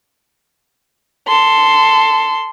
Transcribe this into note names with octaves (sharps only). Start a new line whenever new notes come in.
A4 C6